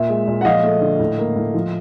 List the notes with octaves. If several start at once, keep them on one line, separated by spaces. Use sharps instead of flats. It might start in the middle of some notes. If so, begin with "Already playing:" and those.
Already playing: A#2 E5
G#3
A#2
F#5
F3 D#5 F5
A3
D3
A2
A#3
A2
F3